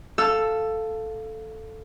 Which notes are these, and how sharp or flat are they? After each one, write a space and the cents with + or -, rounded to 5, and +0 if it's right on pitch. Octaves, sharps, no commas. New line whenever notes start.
A4 +0 F5 +0 E6 +15